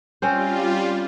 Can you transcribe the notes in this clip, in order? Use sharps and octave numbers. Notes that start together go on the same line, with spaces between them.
G3 C4 C#4 F4 C5